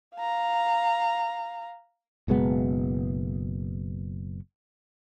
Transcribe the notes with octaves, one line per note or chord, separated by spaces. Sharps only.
F5 A#5
F#1 B2 G#3 B3